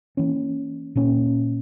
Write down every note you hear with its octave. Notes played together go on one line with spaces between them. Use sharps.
E3 A#3 C#4
A#2 A#3 C#4